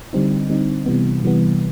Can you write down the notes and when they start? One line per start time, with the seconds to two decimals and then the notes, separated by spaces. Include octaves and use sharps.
0.13 D3 G3 C4 D#4
0.49 D3 G3 C4 D#4
0.86 C3 E3 G3 B3
1.24 C3 E3 G3 B3